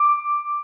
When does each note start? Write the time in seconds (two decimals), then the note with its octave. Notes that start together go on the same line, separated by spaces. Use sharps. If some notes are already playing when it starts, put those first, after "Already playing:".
Already playing: D6